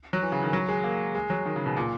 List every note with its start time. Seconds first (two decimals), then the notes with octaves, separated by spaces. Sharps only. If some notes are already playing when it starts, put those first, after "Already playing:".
0.13 F#3
0.22 E3
0.32 C#3
0.43 D#3
0.53 F#3
0.69 G#3
0.84 A#3
1.15 G#3
1.30 F#3
1.46 D#3
1.56 C#3
1.66 B2
1.77 A#2